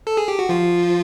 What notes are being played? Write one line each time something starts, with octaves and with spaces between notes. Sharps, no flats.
A4
G#4
G4
F#4
F3 F4